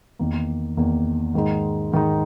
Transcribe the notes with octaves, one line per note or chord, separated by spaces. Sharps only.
E2 D#3 A#3
E2 D#3 A#3
G#2 D#3 G#3 D#4
G#2 D#3 G#3 D#4